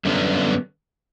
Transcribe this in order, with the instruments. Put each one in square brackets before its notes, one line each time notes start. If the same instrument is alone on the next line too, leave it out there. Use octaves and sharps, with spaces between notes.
[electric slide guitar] F#2 D3 G3 B3